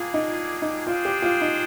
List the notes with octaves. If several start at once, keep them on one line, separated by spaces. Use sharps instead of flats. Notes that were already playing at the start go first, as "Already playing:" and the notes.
Already playing: G3 A#3 D4 F4 G#4
D#4
D#4
G3 D4 F4 G#4 C5 G5
G4
F4
D#4